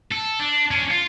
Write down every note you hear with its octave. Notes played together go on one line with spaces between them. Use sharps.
A4
D4
C#4 D4
F4